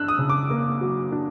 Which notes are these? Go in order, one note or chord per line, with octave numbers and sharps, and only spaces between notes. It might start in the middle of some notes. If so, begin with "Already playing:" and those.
Already playing: D4 E6 F#6
D#6
C#3
D6
A#3
F#3
D4